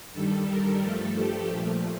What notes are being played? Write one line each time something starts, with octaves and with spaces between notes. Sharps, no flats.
G2 D#3 G3 A4
A#4
G2 F3 A3 A4
G4
A#2 F3 A3